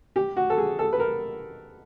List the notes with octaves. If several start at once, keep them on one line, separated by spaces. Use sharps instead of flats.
G4
F#4
A4
G#4
A4
B4
A#4